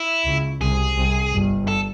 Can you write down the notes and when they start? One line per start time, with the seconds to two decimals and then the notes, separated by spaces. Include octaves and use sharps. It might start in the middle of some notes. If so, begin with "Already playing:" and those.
Already playing: E4
0.25 C#2 C#3
0.61 C2 C3 G#4
0.97 C2 C3
1.32 G1 G2
1.68 A4